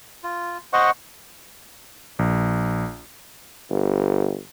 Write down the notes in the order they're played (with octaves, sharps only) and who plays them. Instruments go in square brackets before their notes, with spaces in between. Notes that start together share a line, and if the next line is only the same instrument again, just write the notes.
[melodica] F4
C5 D#5 F#5 C#6
[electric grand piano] A#1
[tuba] G1